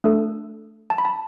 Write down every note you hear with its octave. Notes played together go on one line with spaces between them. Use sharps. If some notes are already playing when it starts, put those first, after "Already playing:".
A3 D4 A4
A5
B5
A5